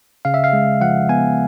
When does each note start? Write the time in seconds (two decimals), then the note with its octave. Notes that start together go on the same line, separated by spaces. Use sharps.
0.25 C#3 F5
0.34 E5
0.44 F5
0.53 G#3
0.81 F3 F#5
1.09 B3 G#5